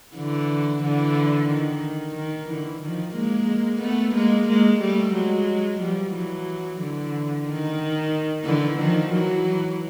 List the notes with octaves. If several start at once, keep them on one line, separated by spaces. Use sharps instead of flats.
D3 E3
D3 E3
D#3
D#3
D3 E3
D#3 F3
G#3 A#3
A3 B3
G#3 A#3
G#3 A#3
G3 A3
F#3 G#3
F3 G3
E3 F#3
D3 E3
D#3
D3 E3
D#3 F3
E3 F#3